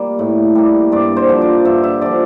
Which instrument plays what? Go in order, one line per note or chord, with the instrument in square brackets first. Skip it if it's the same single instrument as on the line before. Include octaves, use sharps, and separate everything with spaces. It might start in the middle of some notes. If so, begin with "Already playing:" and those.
Already playing: [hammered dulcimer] G3 A#3
A2
G3 A#3
G2 D5
C5
D3 F3
D5
G2 E5
E5
D3 F3 D5